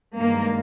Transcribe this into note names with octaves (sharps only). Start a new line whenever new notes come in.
G2 D#3 G#3 A#3